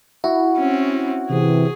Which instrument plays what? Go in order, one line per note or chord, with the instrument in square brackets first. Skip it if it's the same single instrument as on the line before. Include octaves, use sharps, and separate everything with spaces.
[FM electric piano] E4 [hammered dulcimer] F#4
[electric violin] C4 C#4
[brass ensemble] C3 E3 [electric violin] G#4